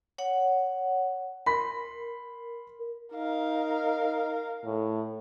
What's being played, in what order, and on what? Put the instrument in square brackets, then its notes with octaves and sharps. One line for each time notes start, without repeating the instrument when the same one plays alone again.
[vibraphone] C#5 F#5
[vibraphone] A#4 [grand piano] B5 C6 B6
[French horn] D#4 [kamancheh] A#4 F5
[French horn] A2